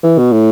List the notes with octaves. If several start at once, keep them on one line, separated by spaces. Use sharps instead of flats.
E3
B2
A2